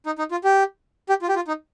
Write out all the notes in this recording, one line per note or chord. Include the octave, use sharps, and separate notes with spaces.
D#4
D#4
F4
G4
G4
F4
G4
F4
D#4